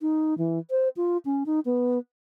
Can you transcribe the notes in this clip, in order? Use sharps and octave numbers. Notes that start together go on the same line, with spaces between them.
D#4
E3
C5
F4
C#4
D#4
B3